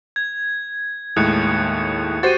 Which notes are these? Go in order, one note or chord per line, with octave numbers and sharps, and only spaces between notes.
G#6
D#2 A2 G#3 D#6 F#6 C#7
F#4 G4 C5 A6 D#7